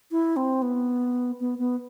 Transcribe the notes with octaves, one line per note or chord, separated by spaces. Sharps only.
E4
C4
B3
B3
B3